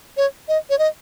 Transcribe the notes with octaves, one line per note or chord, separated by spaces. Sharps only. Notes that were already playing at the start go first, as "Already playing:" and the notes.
C#5
D#5
C#5
D#5